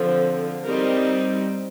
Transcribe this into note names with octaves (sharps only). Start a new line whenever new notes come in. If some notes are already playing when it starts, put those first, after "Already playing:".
Already playing: D3 F3 C4
G3 C4 D#4 A#4